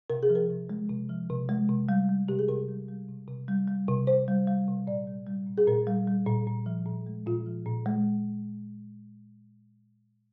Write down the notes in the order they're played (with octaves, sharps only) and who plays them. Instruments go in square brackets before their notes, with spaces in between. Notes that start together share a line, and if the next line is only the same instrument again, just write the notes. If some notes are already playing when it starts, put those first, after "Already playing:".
[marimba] C3 A#4
G#4
F3
A#4
C3
G#3
C3
F3
C3
G#3
C3
G3
G3
C3 G4
G#4
C3 A#4
G3
G3
C3
C3
G3
G3
C3
C3 C5
G3
G3
C3
A#2 D5
G3
G3
A#2
G#4
A#2 A#4
G3
G3
A#2
A#2
F3
A#2
G#3
A#2 F4
F3
A#2
G#3